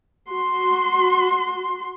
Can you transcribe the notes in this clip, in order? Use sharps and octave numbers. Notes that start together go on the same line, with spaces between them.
F#4 C6